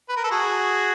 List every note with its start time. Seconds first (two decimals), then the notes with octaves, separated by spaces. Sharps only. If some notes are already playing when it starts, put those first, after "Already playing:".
0.09 B4
0.16 A#4
0.24 A4
0.31 F#4 G#4